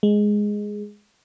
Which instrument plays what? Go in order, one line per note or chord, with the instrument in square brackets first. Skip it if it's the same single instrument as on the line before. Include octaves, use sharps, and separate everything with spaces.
[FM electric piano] G#3